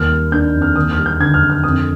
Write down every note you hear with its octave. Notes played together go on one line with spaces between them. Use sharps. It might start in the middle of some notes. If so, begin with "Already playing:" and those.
Already playing: D#2 G3 F6
G3
D4 G6
F2
F6
D#2 D#6
F6
G3
G6
D3 G#6
F6
D3
F6
F2 D#6